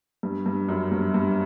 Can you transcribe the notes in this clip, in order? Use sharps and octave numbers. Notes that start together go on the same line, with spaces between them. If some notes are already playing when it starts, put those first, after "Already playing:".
G2
G2
F#2
G2
G2